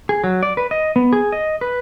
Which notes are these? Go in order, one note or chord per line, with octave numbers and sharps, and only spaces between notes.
G#4
F#3
D5
B4
D#5
B3
G#4
D#5
B4